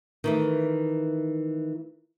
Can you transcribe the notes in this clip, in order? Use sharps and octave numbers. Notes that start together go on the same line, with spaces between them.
D#3 E3 A3